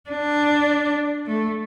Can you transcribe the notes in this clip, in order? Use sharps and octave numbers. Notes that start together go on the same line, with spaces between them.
D4
A3